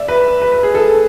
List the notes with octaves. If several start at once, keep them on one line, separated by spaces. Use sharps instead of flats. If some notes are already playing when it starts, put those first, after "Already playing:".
Already playing: D5 E5
B4
B4
B4
G#4
A4